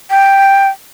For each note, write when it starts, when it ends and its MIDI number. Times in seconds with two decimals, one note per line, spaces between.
0.10 0.68 79